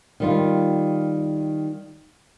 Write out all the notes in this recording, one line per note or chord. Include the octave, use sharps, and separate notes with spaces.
D#3 G3 F4